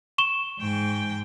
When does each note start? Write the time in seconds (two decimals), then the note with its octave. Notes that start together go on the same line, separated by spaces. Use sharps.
0.18 C#6 E7 G7
0.59 G#2 G5